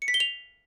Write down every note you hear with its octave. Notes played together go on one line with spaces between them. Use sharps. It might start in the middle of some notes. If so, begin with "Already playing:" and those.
C#7
B6
G7
F7